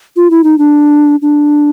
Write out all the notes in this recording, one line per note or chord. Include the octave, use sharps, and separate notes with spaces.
F4
E4
D#4
D4
D4